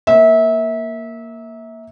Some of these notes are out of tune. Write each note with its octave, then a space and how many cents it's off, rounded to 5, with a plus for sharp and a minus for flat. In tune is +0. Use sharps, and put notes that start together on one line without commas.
A#3 +0 E5 -25